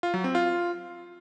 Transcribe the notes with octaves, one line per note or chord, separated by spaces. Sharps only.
F4
F#3
C4
F4